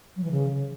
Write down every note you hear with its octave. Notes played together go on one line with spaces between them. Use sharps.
F#3
E3
C#3